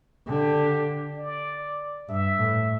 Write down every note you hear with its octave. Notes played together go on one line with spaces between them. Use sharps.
D3 G4
D5
G2 E5
A2